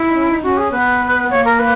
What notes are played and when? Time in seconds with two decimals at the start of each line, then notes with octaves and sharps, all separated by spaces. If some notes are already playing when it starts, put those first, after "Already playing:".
Already playing: E4
0.08 D#4
0.13 C#4
0.28 D#4
0.43 C#4 F#4
0.58 G#4
0.71 B3 B4
1.30 A#3 C#5
1.45 A#4
1.59 B4